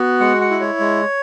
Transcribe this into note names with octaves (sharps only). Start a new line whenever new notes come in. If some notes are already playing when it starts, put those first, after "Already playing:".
Already playing: B3 F#4
G#3 F#5
F#5
E4
C#5
G#3